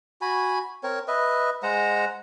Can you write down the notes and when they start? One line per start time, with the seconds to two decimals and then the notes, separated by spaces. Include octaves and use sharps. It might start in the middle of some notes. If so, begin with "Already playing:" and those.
0.21 F#4 G#5 B5
0.83 C4 A#4 C#5
1.08 B4 D#5 E5
1.63 G#3 C5 F#5 A#5